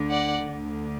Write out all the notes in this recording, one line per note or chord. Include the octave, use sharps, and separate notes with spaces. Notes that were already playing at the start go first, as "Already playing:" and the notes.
Already playing: D2 D3
D5 F#5
D2 D3